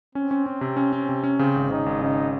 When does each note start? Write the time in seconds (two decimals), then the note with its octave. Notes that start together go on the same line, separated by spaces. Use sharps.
0.15 C4 C#4
0.31 C#4
0.46 C#4
0.61 C3
0.77 C#4
0.93 C#4
1.09 C3
1.24 C#4
1.39 C#3 C4
1.56 G#1
1.71 C#3 D#4
1.86 G#1
2.01 C#3 D#4